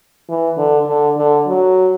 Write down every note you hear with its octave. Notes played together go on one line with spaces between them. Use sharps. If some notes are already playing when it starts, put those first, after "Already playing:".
E3
D3
D3
D3
F#3